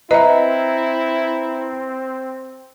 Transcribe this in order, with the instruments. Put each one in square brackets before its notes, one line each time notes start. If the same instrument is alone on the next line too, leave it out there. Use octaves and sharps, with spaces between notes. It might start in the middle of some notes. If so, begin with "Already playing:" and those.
[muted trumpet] C4 [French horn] E4 [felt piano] B4 A#5 [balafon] D#5 E5